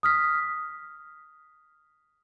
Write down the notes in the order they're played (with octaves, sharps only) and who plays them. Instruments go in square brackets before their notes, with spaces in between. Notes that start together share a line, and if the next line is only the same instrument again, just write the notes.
[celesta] D#6 F6 B6